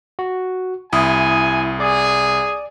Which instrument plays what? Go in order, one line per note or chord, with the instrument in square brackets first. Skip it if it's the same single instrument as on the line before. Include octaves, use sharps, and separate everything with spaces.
[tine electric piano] F#4
[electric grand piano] C2 D#6 [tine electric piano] E4 [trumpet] G#5
[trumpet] G#4 [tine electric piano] D5